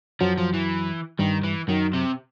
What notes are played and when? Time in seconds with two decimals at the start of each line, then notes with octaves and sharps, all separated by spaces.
0.20 F#2 F3 F#3
0.38 F3
0.54 E3
1.19 G2 D#3 G3
1.44 E3
1.68 F#2 D#3 F#3
1.93 C3